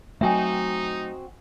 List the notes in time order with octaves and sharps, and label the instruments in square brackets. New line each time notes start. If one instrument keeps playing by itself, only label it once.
[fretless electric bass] F#3 A3 [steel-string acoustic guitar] C4 F#4 [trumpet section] D#4 [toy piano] E5 G5 G#5